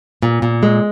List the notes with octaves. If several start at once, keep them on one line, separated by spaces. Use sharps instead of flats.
A#2
A#2
G#3